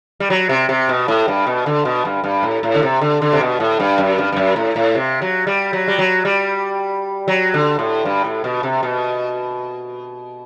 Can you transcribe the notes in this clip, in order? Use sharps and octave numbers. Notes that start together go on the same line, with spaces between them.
G3
F#3
C3
C3
B2
A2
G2
B2
D3
B2
G2
G2
A2
A2
D3
C3
D3
D3
C3
B2
A2
G2
F#2
G2
G2
F#2
A2
A2
C3
F#3
G3
F#3
G3
F#3
G3
F#3
D3
A2
G2
A2
B2
C3
B2